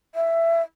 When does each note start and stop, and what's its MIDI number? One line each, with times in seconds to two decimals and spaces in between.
0.15 0.62 76